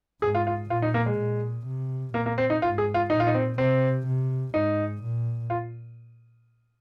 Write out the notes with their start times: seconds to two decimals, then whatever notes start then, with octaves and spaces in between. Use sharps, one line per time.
0.22 G#2 G#4
0.35 F4
0.47 F4
0.70 A#2 F4
0.82 D#4
0.94 A#3
1.06 G#3
1.18 A#2
1.66 C3
2.14 A#2 A#3
2.26 A#3
2.38 C4
2.50 D#4
2.62 G#2 F4
2.78 G#4
2.94 F4
3.10 A#2 D#4
3.20 F4
3.27 D#4
3.34 C4
3.58 C3 C4
4.07 C3
4.54 G#2 D#4
5.02 A#2
5.50 F4